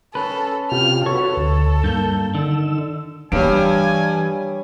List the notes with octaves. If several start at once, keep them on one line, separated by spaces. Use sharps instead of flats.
C#4 A4 B4
C3 F4 G4 F6
F#4 A4 B4 C#5
D2
G2 A#3 G6
D3 D#3 E6
G2 E3 G3 C#5 G#5 D7